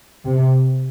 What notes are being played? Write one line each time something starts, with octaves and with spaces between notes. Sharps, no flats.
C3